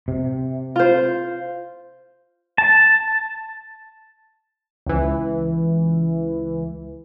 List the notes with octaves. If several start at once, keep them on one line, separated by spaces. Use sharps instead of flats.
C3
F4 C5
A5
C#2 E3